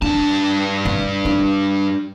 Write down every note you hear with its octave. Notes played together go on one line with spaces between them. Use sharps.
G2 D4 A5
D4
D4